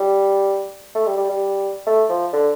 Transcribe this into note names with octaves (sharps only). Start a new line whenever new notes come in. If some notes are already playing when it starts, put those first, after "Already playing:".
Already playing: G3
A3
G3
G3
G3
A3
F3
D3